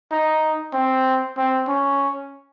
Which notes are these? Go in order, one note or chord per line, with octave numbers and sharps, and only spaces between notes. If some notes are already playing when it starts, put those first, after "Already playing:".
D#4
C4
C4
C#4